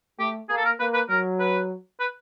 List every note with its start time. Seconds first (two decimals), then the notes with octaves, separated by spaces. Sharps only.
0.19 A3 G4
0.49 A#3 G#4
0.57 A4
0.65 A#4
0.80 A#3 B4
0.94 B4
1.09 F#3 A#4
1.40 B4
2.00 B4